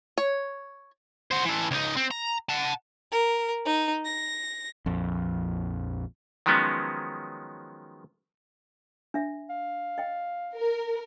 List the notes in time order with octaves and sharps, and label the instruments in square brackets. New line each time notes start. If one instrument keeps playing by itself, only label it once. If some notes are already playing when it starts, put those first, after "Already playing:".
[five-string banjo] C#5
[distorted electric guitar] F#4 C5
E3 A4
C#2 D#4
C4
A#5
F#5 A5
[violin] A#4
D#4
A#6
[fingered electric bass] A#1 F2
[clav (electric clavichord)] D#3 F3 F#3 G#3 B3 C#4
[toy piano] D4 E5
[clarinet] F5
[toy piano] D#5 G5
[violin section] A#4